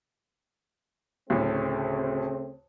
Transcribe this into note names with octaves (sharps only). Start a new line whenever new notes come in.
D2 A2 C#3 A3 C4